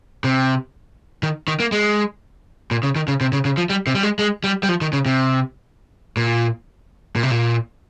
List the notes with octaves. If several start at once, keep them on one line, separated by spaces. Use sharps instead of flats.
C3
D#3
D#3
A#3
G#3
A#2
C#3
D#3
C#3
C3
C#3
C#3
F3
G3
C3
G3
G#3
G#3
G3
G3
F3
D#3
C#3
C3
A#2
A#2
C3
A#2